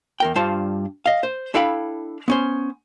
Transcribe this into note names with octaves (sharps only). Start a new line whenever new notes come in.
E2 A#4 G5
G2 D4 F4 C5 A5
D#5 F5
C5
D4 E4 A4 F5 G5 B5
B3 C#4 C5